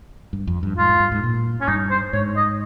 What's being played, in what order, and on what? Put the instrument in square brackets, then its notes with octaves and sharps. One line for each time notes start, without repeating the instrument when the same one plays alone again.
[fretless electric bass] G2
F2
G2
[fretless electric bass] G#2 [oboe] F4
[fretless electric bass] G#2
G2
G#2
A#2
[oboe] C#4
[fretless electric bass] G2 [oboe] D#4
[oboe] C5
[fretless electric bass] G#2 [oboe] C#5
[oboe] D#5